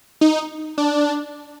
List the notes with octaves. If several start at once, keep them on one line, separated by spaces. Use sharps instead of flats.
D#4
D4